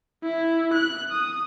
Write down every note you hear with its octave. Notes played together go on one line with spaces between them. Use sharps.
E4
F#6
D#6